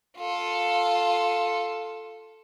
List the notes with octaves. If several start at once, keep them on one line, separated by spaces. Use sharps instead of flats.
F4 A4